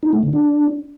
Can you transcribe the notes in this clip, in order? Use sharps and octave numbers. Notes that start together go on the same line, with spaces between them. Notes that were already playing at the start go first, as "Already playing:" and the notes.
D#4
A3
D3
D4